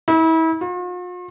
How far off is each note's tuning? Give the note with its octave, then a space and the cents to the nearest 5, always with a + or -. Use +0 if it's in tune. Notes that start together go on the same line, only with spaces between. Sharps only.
E4 -35
F4 +45